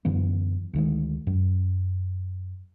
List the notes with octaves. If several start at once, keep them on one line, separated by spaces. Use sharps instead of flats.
F#2 D3 E3 B3
D2 D#3 G#3
F#2